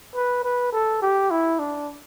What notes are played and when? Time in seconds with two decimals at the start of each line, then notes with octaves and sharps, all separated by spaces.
0.15 B4
0.43 B4
0.72 A4
1.02 G4
1.30 E4
1.59 D4